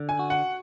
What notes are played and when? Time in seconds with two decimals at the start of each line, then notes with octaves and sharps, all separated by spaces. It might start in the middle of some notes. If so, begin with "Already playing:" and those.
Already playing: D3
0.09 G#5
0.19 F#4
0.30 F#5